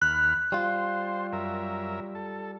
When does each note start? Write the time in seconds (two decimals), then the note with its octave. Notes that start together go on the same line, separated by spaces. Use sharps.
0.02 D#2 B5 F6 F#6
0.52 G3 F4 C5
1.33 F#2 A#4 E5
2.15 A4